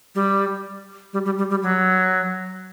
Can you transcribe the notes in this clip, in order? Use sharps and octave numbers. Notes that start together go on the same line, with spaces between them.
G3
G3
G3
G3
G3
F#3